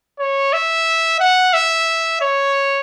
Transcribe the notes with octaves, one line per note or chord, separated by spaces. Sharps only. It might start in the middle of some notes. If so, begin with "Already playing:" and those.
C#5
E5
F#5
E5
C#5